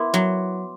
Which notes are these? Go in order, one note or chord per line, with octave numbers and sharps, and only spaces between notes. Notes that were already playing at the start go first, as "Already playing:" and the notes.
Already playing: B3 E4 C6 D6
F#3